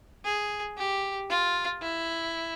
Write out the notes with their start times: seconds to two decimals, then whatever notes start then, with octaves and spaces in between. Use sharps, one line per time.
0.25 G#4
0.78 G4
1.30 F4
1.82 E4